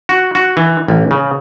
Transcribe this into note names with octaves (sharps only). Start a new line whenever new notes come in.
F#4
F#4
E3
A1
C#3